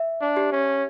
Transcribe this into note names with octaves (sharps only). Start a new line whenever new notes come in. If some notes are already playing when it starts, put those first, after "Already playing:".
Already playing: E5
D4
G4
C#4